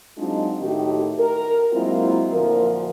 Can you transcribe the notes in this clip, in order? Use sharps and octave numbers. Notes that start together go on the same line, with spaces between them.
F#3 G#3 C4 D4 D#4 F4
A2 D#3 A3 D#4 F#4 G4
A#4
F#3 G#3 A#3 C4 E4 F4
D2 A#2 F3 A#4